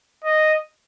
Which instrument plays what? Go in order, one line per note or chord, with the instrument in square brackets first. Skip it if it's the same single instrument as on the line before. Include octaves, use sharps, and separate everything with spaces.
[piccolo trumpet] D#5